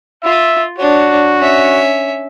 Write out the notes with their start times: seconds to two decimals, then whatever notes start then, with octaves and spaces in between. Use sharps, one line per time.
0.24 F4 E5
0.78 D4 F#4 C#5
1.39 C#4 E5